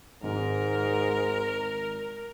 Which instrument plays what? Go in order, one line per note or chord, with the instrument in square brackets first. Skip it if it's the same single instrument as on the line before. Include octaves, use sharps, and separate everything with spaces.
[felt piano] G#1 [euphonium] G#2 [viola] A#4